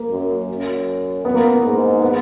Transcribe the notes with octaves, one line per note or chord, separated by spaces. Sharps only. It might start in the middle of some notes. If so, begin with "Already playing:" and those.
Already playing: A#3
F#2
F#2
B3
A#3
B3
G#2
B3